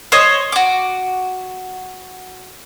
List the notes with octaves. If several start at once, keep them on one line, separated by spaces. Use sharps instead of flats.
C5 C#5 D#5
F#4 D6